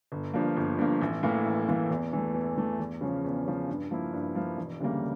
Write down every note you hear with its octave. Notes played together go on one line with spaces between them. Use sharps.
G1
G2 F3 A#3
G1
G2 F3 A#3
A1
A2 E3 A#3
A1
A2 E3 A#3
E2
E3 A3
E2
E3 A3
E2
C#3 F3 C#4
E2
C#3 F3 C#4
G2
F3 A#3 E4
G2
F3 A#3 E4
E1
D2 C#3 G3 A#3